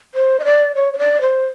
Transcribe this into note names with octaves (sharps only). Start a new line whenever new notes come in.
C5
D#5
D5
C#5
C#5
D5
C5